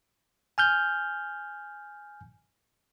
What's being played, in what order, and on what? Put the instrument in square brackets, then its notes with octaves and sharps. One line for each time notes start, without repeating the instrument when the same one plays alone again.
[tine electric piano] G#5 F6 G6